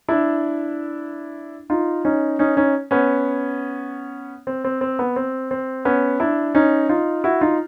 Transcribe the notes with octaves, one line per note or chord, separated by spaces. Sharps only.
D4 E4
D#4 F4
C#4 D#4
C#4 D#4
C#4 D#4
B3 C#4
C4
C4
C4
B3
C4
C4
B3 C#4
D4 E4
C#4 D#4
D#4 F4
E4 F#4
D#4 F4